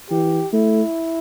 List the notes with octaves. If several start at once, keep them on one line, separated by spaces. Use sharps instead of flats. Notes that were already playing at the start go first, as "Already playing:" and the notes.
E3 G4
A3 E4